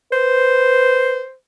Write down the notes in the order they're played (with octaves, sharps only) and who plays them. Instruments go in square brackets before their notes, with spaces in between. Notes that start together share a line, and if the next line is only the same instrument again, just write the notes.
[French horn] B4 [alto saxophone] C5